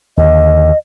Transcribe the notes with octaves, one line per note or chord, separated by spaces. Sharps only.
D#2 D3 D#5